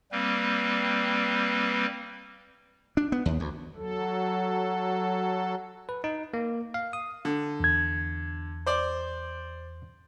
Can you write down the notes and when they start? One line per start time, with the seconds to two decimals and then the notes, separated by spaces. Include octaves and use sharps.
0.12 G3 A#3 C4 B4
2.97 D4
3.12 B3
3.26 D#2
3.40 D2
3.76 F#3 A4
5.89 B4
6.04 D#4
6.34 A#3
6.74 F5
6.93 D#6
7.25 D3
7.60 E2 G#6
8.66 C5 D5